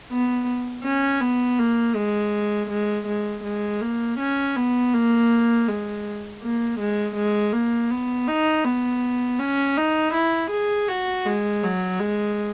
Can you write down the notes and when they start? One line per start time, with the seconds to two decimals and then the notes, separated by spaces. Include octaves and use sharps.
0.10 B3
0.84 C#4
1.21 B3
1.59 A#3
1.96 G#3
2.70 G#3
3.07 G#3
3.44 G#3
3.81 A#3
4.19 C#4
4.57 B3
4.94 A#3
5.68 G#3
6.42 A#3
6.80 G#3
7.16 G#3
7.53 A#3
7.91 B3
8.28 D#4
8.65 B3
9.39 C#4
9.78 D#4
10.14 E4
10.51 G#4
10.89 F#4
11.26 G#3
11.63 F#3
12.00 G#3